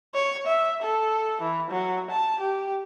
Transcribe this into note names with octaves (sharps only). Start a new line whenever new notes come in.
C#5
E5
A4
E3
F#3
A5
G4